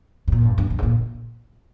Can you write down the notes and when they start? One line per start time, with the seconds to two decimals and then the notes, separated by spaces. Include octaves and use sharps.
0.28 G#2
0.32 A#2
0.45 G2
0.58 G2
0.70 G2
0.78 G#2
0.83 A#2